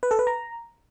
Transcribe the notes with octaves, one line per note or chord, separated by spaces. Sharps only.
B4
A4
B4
A#5